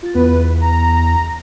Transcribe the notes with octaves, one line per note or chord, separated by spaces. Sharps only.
F4 A6
E2 B3 B4
A#5